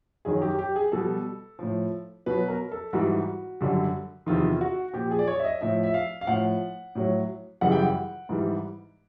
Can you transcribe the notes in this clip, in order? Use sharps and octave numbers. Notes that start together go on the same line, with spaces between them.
F#2 D#3 F#3 G#4
G4
G4
G#4
B2 G3 A4
A2 F3
B2 F#3 B4
A#4
A4
G#2 E3 G3 F#4
F#2 D3 G3
E2 C3 D#3 F4
F#4
A#2 F3 G4
G#4
D5
C#5
E5
D#5
A2 F3 E5
E5
F5
F5
A2 F3 F#5
A2 F#3
F#2 C#3 E3 G3 F#5
G5
F#5
G#2 E3 G3